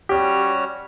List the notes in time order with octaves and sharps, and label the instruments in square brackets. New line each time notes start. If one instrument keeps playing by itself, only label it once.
[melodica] G3 C#4 F#4 C#5 [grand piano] G4